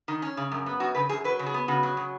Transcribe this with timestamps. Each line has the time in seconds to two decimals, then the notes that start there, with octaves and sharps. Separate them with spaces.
0.08 D#3
0.22 C#4
0.37 C#3
0.52 F#2
0.66 B3
0.80 F#2 F#4
0.95 C#3 B4
1.09 F#2 G#4
1.24 F#3 B4
1.39 C#3
1.46 G#4
1.54 B3
1.68 C#3 F#4
1.83 F#3
1.97 C#3